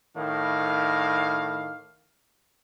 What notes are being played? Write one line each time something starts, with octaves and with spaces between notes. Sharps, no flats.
A2 D#3 D4 F5